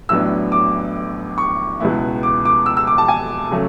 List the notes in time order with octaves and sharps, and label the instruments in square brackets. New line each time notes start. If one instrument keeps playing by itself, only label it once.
[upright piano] A1 A2 F#3 B3 D4 E6
D6
C#6
C#2 B2 G#3 B3 E4
D6
D6
E6
E6
D6
A5
G#5
C#3 F#3 A3 C#4